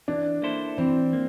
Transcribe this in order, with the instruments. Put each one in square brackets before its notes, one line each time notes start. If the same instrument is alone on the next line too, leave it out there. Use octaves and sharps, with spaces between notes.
[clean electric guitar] E3 [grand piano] D4
[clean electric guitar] A#3 E4 A4 C5
[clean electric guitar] E3 [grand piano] C4
[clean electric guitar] A#3